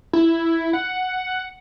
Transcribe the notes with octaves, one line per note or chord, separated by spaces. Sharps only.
E4
F#5